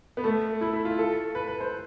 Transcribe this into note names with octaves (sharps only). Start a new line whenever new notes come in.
B3
A3
E4
E4
F4
A4
B4
B4
C5